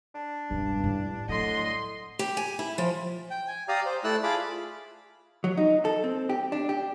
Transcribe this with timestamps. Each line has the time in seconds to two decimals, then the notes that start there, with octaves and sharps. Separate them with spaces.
0.14 D4
0.50 E1 G2 C#4
0.84 A2
1.28 A2 D3 F#3 G3 D#5 C6
2.19 G4
2.37 G#5
2.59 E4
2.78 F3
3.30 G5
3.48 G#5
3.68 G4 D5 F5 A#5 D#6
3.86 C5
4.04 A3 E4 D5 E6 F#6
4.24 F4 G#4 A5 B5 D6
5.44 F#3
5.57 D#4
5.85 A4
6.04 C4
6.30 G4
6.52 D4
6.69 G4